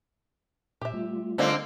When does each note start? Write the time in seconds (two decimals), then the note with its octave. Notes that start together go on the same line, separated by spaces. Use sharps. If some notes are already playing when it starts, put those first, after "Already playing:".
0.81 A#2 G4 E5
0.93 G3 A3 F4
1.38 D3 A#3 C4 C#4 D5 D#5